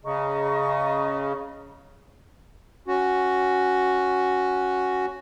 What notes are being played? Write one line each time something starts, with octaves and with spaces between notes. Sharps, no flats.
C#3 D#5 A#5 C#6
C#4 F#4